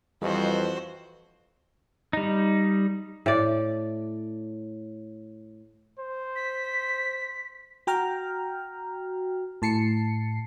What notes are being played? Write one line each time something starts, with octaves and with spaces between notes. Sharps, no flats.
F2 E3 G3 F#4 B4 C5 D#5
G3 D#4
A2 D5
C5
B6
F#4 G5 A#5 F6
A2 A5 C7 C#7